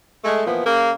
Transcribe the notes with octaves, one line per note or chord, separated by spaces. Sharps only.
G#3 A3
A#2 E3 F3 B3
C#3 A#3